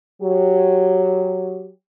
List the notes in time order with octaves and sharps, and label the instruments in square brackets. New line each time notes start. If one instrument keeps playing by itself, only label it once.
[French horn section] F#3 G4